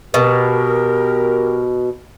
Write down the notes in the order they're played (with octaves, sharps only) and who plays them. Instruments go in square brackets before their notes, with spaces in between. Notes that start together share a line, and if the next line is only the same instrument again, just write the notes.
[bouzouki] B2 [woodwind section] G4 A#4